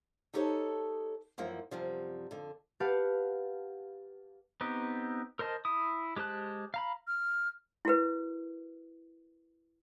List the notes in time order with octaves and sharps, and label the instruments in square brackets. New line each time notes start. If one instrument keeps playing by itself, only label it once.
[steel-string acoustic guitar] D#4 G4 A4 C5 C#5 D#5
F#2 E3 F3 A#3
F#2 C3 F3 G3
F2 D3
[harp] G4 B4 F5 F#5 A5
[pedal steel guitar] B3 C4 D#4 G4
A#4 C5 D#5 A5
E4 D#6
G#3 G4 C5 A5 F#6
F5 A#5 B5
[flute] F6
[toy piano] E4 F#4 A#4 B4